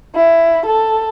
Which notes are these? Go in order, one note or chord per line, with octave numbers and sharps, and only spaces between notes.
E4
A4